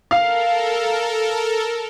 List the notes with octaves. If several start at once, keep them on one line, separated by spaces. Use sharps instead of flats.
A4 A#4 F5